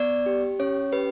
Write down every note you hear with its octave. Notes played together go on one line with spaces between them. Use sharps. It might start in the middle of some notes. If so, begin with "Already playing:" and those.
Already playing: B3 D5
G4
C#4 C#5
G4 B4